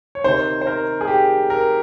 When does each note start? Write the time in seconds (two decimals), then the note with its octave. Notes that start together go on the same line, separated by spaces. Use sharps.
0.15 C#5
0.24 C3 D#3 C5
0.62 C5
0.67 A#4
1.01 G#4
1.08 G4
1.50 A#4